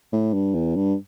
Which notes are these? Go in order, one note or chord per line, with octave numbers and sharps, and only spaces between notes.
A2
G2
E2
G2